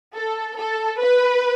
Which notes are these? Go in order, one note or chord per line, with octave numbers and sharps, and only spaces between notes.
A4
A4
B4